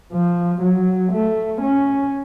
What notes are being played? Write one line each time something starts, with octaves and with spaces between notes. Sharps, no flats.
F3
F#3
A3
C#4